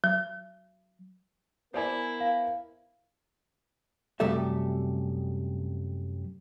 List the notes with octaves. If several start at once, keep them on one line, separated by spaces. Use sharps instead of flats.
F#3
B3 E4 A#4 C5 D5 G#5
F5
F#2 C3 G3 A3 A4 E5